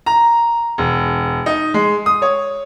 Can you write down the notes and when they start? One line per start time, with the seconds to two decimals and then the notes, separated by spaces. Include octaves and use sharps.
0.06 A#5
0.78 E1
1.46 D#4
1.74 G#3
2.06 D#6
2.22 C#5